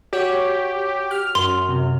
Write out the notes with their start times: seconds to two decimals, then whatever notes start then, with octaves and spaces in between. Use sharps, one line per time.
0.13 F#4 G4 C#5
1.11 F6
1.35 F#2 C6
1.69 C3